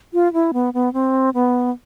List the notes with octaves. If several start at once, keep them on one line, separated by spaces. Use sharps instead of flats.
F4
E4
B3
B3
C4
B3